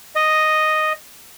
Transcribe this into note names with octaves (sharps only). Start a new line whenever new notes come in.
D#5